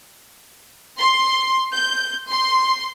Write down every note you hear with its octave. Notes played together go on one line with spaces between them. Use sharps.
C6
G6
C6